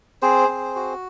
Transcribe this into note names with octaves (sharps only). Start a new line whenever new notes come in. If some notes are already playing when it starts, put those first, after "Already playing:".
C4 G#4 C5
C4
F#4